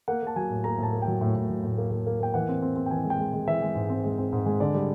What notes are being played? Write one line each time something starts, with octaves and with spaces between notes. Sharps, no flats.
A#3 F#5
A#3 A5
F#3 G#5
A2
A#3 A#5
A2 A5
A#3
G5
F#3
A2
A2
F#3
A2
A#3
A#3
A#3
A#3 G5
E3 F#5
C4
C4
C4
G5
E3 G#5
G#3
G5
G#3
G#3
E3 E5
G#3
G#2
C4
G#3
C4
G#2
G#3
D3 D5
G3